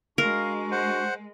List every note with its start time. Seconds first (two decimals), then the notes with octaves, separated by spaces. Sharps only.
0.18 G#3 D4 F#4 A#4 F5 C#6
0.72 C5 F#5